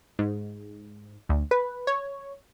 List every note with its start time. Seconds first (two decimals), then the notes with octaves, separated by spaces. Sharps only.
0.19 G#2
1.29 D2
1.51 B4
1.87 C#5